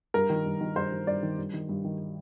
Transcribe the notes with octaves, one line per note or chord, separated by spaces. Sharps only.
G2 A#4
D#3
G2
D#3
G2 C5
D#3
G2 D5
D#3
G2
D#3
G2
D#3